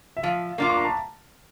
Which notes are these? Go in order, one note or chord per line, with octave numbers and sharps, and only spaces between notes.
E5
F3 F5
A#3 D4 F4 D6
C#6
A#5
A5